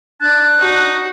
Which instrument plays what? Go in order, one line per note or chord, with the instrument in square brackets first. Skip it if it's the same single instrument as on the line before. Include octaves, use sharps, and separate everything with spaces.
[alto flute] D4 [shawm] A5 [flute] F#6
[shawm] D#4 [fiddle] F#4